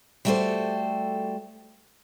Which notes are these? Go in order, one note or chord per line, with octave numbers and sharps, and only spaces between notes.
G3 A3 F#4 G4 A4 C5